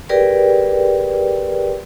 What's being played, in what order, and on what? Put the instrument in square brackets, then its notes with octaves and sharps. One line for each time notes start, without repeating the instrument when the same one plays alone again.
[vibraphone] G4 G#4 A#4 B4 D5 G5